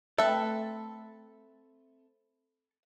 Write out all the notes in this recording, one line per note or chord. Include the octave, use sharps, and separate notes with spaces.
A3 C4 A4 B4 E5